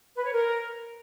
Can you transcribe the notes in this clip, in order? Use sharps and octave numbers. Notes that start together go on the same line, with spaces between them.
B4
C#5
A#4